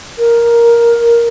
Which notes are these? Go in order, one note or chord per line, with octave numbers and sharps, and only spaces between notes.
A#4